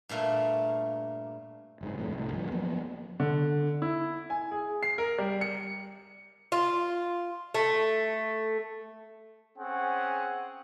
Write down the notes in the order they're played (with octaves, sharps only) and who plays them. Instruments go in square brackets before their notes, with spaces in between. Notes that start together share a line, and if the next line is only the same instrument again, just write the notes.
[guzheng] G2 A#2 A3 A#3
[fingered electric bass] F#1 G#2
B1 F2 A2
C2 A2
D2 G2 F3
F3 F#3 A#3 B3
[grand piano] D3
E4
G#5
G#4
C7
A#4
G3
C#7
[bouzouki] F4
A3
[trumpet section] C4 C#4 G#4 F#5